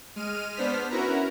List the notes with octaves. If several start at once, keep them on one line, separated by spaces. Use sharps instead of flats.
G#3 F6 D#7
B3 D4 C5 F6 B6
C#4 E4 F#4 A#4 B4 A#5